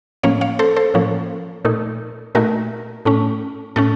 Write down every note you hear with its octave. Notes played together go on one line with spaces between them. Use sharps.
A2 F3 A#3 C#4 C#5 F5
C#5 F5
A4 C5
A4 C5
A2 F3 A#3 C#4
A#2 A3 D#4
A#2 A3 D#4 F#4 A#4
A2 A3 C#4
A2 A3 C#4 A4